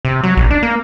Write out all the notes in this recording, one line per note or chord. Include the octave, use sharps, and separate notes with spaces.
C3
F#3
A#1
D4
A#3